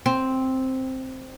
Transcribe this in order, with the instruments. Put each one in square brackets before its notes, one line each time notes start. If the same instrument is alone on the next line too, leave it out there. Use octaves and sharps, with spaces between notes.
[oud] C4